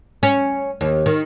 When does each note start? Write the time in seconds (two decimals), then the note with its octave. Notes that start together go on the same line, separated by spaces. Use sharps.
0.23 C#4
0.81 D#2
1.06 D#3